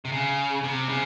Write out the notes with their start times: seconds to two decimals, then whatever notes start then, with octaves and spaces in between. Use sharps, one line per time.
0.05 C3
0.12 C#3
0.64 C3
0.89 C#3